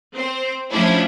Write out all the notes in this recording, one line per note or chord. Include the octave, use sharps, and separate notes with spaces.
C4 C5
F3 A3 C#4 D4 E4